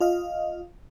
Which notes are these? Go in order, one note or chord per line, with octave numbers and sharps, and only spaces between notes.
F4 D#5 F5